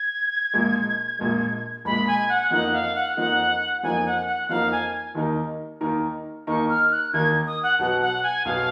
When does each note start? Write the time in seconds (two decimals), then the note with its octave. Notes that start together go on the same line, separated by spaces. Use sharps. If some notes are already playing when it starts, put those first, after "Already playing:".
Already playing: G#6
0.54 A#1 A#2 G#3
1.19 A#1 A#2 G#3
1.85 A#1 A#2 G#3 B5
2.07 G#5
2.29 F#5
2.51 F2 F3 A#3 D#4 F#5
2.73 F5
2.95 F#5
3.17 F2 F3 A#3 D#4 F#5
3.83 F2 F3 A#3 D#4 G#5
4.06 F#5
4.26 F#5
4.49 F2 F3 A#3 D#4 F5
4.71 G#5
5.15 D#2 D#3 A#3 D#4 A#4
5.81 D#2 D#3 A#3 D#4 A#4
6.47 D#2 D#3 A#3 D#4 A#4 C#6
6.69 F6
6.91 F#6
7.13 D#2 D#3 A#3 D#4 A#4 G#6
7.46 D#6
7.63 F#5
7.79 B1 B2 F#3 B3 F#5
8.01 F#5
8.23 G#5
8.45 B1 B2 F#3 B3 F5